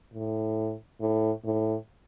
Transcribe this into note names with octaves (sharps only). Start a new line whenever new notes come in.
A2
A2
A2